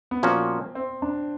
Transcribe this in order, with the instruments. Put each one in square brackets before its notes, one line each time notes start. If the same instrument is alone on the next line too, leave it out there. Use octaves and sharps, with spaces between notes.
[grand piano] B3
[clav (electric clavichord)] A#2 F3 A#3 C#4 F#4 [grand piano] C4
[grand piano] C4
D4